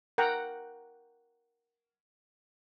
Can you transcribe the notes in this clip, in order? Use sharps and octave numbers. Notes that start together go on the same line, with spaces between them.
A#4 F#5 G5 A#5